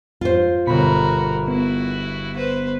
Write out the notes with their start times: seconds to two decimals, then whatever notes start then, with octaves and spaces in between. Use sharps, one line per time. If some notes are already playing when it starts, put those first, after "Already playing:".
0.21 F2 F4 C5
0.67 G1 B2 F#4 A#4 B5
1.48 B3 E4 F#4
2.36 B4 C5